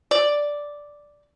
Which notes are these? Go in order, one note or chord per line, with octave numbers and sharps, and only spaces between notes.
D5